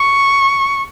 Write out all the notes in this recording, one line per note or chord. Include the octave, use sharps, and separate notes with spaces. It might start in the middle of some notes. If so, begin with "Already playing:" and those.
Already playing: C#6